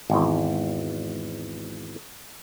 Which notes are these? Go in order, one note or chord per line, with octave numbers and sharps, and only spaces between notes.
G#1 E2